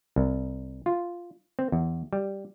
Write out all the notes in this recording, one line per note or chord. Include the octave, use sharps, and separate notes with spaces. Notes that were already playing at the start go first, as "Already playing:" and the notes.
C2
F4
C4
E2
G3